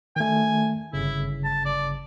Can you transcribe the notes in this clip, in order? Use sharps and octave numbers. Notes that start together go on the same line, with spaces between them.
D#3 A3 G#5
G1 C#3 E4
A5
D5